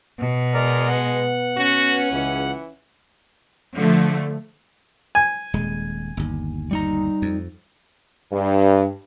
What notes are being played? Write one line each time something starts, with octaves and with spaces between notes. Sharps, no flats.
B2
G#3 A#4 D5 A#5
B3 F#5
C#4 F#4
C#2 E3
D3 F3 A3
G#5
D#1 G#3
G1 D#2
G3 D#4 A#5
F2
G2